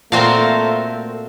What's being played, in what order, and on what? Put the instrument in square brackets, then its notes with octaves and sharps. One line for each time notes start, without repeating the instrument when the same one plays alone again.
[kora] A#2 [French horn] A3 [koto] C4 F#4 F5 [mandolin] A#4 C5 A5